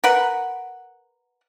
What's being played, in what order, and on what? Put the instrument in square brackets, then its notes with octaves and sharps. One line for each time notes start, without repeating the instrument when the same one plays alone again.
[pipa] A#4 B4 F#5